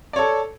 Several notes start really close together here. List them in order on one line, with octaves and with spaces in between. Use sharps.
D5 C#5 A4